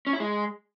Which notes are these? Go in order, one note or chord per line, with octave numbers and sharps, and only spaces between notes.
C#4
E4
G#3